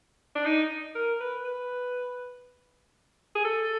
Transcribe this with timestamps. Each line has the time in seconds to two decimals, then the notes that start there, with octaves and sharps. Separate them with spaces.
0.35 D4
0.45 D#4
0.95 A#4
1.20 B4
1.45 B4
3.35 G#4
3.45 A4